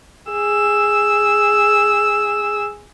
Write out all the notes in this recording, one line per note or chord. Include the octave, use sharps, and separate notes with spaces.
G#4 E6